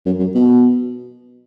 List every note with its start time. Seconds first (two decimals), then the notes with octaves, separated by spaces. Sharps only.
0.06 F#2
0.19 F#2
0.34 B2